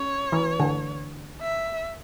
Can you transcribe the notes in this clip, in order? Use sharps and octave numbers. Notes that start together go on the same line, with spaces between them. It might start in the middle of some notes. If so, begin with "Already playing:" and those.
Already playing: C#4 C#5
E3
D3
E5